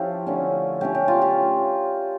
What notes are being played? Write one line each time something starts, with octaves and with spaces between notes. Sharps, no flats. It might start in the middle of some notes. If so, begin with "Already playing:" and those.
Already playing: F3 C#4 E4 F4 G4 A4
D3 A3 C#4
D3 A3 C#4 G4
G4
F4
G4